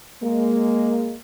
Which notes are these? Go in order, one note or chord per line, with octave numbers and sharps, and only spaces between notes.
G#3 A#3